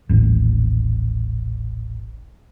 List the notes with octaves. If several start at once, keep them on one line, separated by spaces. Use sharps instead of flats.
D#1 A1